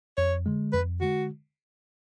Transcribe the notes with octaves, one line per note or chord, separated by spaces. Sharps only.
F2 C#5
D3 G#3
F2 B4
D3 G#3 F#4